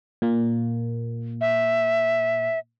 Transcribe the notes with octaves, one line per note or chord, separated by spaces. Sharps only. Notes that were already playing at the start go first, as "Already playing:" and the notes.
A#2 A#3
E5